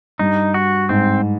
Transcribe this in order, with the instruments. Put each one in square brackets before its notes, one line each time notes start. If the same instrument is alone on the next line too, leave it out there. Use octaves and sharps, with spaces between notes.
[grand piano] G2 [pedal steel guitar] D#4
[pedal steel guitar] F#4
[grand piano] G#2 [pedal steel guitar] C4